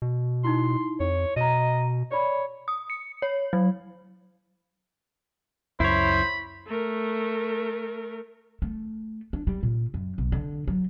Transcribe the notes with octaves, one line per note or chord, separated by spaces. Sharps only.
B2
D#4 E4 C6
F2 C#5
B2 D#5 A#5 D#7
C#5 D5 B5
D#6
C#7
C#5
F#3
C#2 F#2 E4 C5 C#5 B5
A3 A#4
A3
D4
G3
A#2
F#2
B1
D3
F#3